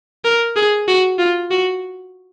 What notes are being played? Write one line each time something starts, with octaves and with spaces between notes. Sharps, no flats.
A#4
G#4
F#4
F4
F#4